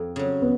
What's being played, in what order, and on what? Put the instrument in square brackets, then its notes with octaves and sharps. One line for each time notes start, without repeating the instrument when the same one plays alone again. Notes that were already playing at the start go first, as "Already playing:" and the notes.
Already playing: [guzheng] F2
C#3 F#3
[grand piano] B3